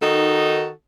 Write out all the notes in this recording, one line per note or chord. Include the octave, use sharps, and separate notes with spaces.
D#3 D#4 F#4 A4